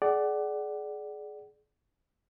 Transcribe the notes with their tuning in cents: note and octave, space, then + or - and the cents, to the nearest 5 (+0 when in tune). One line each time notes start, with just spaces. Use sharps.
G#4 +25 D5 +0 F#5 +25